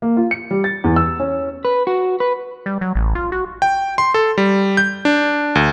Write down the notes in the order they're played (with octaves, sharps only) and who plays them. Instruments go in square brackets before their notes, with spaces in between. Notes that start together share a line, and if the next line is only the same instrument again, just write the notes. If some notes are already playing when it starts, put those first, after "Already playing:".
[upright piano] A#3
F4
C#7
G3
A6
E2
E6
C#4
[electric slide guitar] B4
F#4
B4
[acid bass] G3
F#3
A1
F4
F#4
[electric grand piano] G5
C6
A4
G3
G6
D4
D2